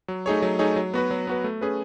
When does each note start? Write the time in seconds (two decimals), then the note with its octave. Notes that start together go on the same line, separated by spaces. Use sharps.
0.08 F#3
0.26 A3 D#4 G#4 C#5
0.42 F#3
0.59 A3 D#4 G#4 C#5
0.76 F#3
0.94 B3 F#4 B4
1.11 F#3
1.27 B3 F#4 B4
1.44 A3
1.61 C#4 G#4 B4